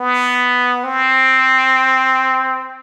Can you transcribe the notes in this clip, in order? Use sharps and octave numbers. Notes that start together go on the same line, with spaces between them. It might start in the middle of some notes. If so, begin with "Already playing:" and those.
Already playing: B3
C4